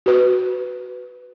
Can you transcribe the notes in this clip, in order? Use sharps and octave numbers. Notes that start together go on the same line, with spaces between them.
F#4 B4